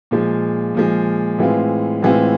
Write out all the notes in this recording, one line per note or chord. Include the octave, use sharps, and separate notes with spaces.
A#2 F3 G#3
A#2 F3 G#3
A2 E3 G#3 C4 F4
A2 E3 G#3 C4 F4